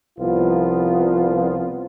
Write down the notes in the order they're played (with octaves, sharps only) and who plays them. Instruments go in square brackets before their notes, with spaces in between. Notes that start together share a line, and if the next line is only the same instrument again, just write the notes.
[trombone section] C2 F3 B3 F4